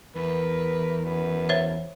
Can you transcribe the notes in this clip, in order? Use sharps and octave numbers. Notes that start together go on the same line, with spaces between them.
E2 A#4 B4
F#2 B4
C5 C#5 E5